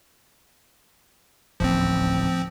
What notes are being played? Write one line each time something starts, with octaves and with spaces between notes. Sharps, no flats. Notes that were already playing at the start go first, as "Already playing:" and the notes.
D1 A1 D#2 F3 C4